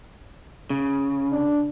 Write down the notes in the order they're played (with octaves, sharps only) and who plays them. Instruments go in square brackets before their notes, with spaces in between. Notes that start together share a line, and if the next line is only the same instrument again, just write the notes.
[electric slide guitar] C#3
[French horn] D4